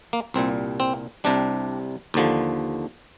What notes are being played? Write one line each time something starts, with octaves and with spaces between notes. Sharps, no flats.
A#3
C2 A#2 G3 C4
C4
C2 C3 G3 D4
D#2 D3 F3